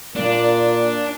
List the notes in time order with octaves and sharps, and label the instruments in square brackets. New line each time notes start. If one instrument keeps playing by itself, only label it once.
[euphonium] A#2 [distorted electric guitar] D4